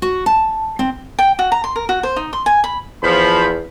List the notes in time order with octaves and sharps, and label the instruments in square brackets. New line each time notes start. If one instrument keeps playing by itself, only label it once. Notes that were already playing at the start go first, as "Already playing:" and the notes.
[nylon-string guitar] F#4
A5
C4
[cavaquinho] G5
F#4
A#5
C6
A#4
F#4
C5
D#4
C6
G#5
B5
[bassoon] E2 [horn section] F3 B5